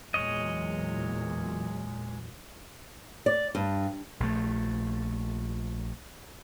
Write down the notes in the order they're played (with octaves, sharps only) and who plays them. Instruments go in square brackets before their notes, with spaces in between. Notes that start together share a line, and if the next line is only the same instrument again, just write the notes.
[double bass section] E2 A#2 F#3 [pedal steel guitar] G#3 C#5 D#5
[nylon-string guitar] D5
G2
[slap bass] A#1 A3